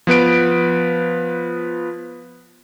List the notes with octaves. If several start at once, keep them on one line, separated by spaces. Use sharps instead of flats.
F3 B3 B4 D7